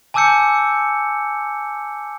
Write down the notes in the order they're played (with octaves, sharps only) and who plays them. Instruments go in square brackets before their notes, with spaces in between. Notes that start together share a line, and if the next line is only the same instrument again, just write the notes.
[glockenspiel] G#5 A5 D6 E6 G6 C#7